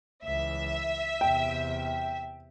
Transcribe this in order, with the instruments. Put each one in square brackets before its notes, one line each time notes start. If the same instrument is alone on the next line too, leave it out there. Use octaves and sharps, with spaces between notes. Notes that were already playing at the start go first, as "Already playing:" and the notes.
[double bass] C#2 E3 [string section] E5
[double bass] E2 C3 [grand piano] G5